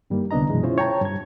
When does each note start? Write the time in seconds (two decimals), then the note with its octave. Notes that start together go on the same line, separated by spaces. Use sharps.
0.10 G2 D#3 G3 A#3
0.31 C2 D3 B3 D4 D#5 A#5
0.48 F#2 B2 E3 G#3
0.63 C#4 E4 F4 C5 C#5
0.78 C#5 G5 A5 A#5
1.01 G2 G#6